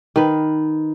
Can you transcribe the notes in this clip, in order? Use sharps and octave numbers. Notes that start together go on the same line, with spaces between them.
D#3 B4